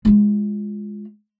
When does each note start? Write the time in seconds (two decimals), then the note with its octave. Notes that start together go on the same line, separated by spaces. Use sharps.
0.05 G#3 F4